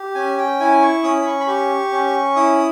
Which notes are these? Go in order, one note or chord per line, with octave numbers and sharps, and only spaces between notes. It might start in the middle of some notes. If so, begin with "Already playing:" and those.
Already playing: G4
C#4 G#5
G5
E4 G#5
C#6
C#4 D#6
B5
C#6
B5
G4 C#6
C#4
E4 D#6